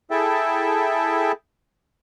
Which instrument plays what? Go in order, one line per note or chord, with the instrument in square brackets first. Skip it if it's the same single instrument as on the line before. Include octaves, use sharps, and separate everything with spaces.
[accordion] E4 G#4 A4 E5 G5 A5